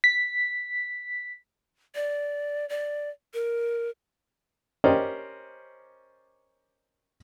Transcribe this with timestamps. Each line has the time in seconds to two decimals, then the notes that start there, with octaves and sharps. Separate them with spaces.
0.04 B6
1.95 D5
2.69 D5
3.34 A#4
4.84 C#4 G4 A#4 C5 D5 D#5